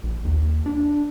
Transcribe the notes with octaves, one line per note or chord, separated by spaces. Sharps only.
A#1
D#2
D4